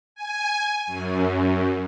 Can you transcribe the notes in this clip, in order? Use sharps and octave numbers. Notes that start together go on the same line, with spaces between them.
G#5
F#2